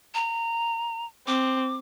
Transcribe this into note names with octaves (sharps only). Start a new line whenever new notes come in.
A#5
C4 D6